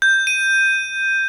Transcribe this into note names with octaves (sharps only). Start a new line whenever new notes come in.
G6
D#7